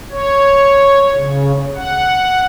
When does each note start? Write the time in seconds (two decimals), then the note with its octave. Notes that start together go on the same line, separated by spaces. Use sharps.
0.11 C#5
1.14 C#3
1.76 F#5